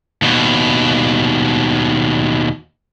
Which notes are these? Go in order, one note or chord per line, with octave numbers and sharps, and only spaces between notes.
D#2 B2